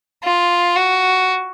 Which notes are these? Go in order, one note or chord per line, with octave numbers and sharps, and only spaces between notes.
F4
F#4